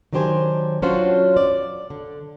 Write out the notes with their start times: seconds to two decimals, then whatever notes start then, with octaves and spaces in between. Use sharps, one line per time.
0.13 D#3 F#3 D4 G4 C5 G#5
0.82 F#3 C#4 D4 F4 F#4 C5
1.37 D5
1.90 D3